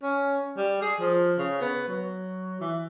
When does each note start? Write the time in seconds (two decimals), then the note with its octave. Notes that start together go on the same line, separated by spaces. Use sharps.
0.03 C#4
0.57 G3
0.82 G#4
1.00 F3
1.39 C#3
1.61 B3
1.88 F#3
2.61 E3